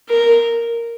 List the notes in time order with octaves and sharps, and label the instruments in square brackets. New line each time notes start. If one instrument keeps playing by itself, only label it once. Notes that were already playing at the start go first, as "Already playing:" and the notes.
[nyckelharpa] A#4